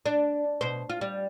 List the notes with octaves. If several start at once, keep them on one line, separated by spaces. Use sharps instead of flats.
D4
B2 C5
F4
G3